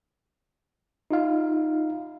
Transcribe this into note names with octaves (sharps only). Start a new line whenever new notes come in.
D#4 F4 F5